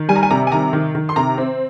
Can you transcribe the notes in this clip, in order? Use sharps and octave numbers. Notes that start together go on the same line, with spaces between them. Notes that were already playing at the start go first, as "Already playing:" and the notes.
Already playing: D#3
G3 G#5
A#5
G#5
C3 A#5
G#5
D#3 A#5
D#3
D#3
C6
C3 A#5
C4